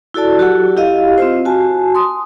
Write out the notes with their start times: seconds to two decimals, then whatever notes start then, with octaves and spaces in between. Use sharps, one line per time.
0.14 E4 F#4 A4 D5 A5
0.38 F#3 F#4 G4 A4 F#5
0.77 E4 G4 D#5 F5
1.18 C4 F4 C5
1.45 F#4 G#5 A5
1.95 C6 D#6